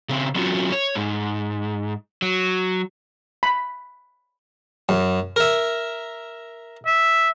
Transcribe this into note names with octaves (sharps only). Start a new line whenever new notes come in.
C#3 C4
F#3 C4 C#4 F4 F#4
C#5
G#2
F#3
B5
F#2
A#4 E5
E5